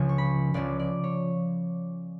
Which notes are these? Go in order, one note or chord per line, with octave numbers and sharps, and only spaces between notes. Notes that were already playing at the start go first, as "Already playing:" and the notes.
Already playing: C#2 C#3 F3 G#5
C#6
B5
C#2 C#3 F3 D5
D5
C#5